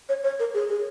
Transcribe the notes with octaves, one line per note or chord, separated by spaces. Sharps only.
C#5
C#5
A#4
G#4
G#4